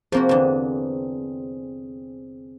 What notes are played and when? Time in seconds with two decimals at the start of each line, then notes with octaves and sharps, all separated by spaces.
0.12 F3 A#3 C4 F#4 G#4
0.29 E2 D3